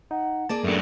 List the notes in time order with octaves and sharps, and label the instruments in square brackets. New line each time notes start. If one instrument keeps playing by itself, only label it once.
[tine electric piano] D#4 [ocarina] F#5
[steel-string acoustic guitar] A#3 G#4 D5 [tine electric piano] A5
[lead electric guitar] F#2 D4 [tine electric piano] A3 C#7 [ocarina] A#4